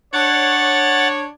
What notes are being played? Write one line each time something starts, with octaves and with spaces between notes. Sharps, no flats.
D4 C#5 F#5 A6